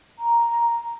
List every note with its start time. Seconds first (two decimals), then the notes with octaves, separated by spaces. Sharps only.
0.19 A#5